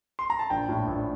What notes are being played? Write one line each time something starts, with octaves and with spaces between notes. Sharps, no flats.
C6
A#5
A5
A#1 G5
A2 A3
A#1